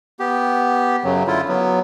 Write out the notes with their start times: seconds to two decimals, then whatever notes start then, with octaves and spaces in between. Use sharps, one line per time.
0.20 B3 G4
1.04 F#2 C#3 F#3
1.27 D3 E4 F4
1.49 F#3 B3